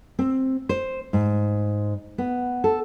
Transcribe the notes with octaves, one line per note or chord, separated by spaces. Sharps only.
C4
C5
G#2
B3
A4